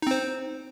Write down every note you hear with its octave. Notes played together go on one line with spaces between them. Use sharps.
C4 D#4 C5